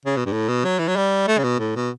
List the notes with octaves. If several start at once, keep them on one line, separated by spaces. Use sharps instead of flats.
C#3
B2
G2
A2
B2
F#3
E3
F#3
G3
A3
C#3
B2
A2
B2